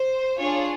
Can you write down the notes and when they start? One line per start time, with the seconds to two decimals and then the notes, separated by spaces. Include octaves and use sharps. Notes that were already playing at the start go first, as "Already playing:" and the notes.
Already playing: C5
0.39 D4 F4 G#4 C#5